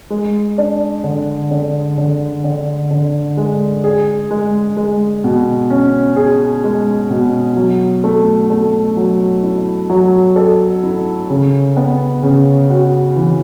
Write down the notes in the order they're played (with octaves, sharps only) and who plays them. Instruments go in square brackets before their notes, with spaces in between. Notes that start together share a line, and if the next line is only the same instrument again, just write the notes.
[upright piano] G#3
D4
D3
D3
D3
D3
D3
G#3
G#4
G#3
G#3
B2
C#4
G#4
G#3
B2
F#3
A3
A3
F#3
E4
F#3
A4
E4
C#3
B3
C#3
F#4
E3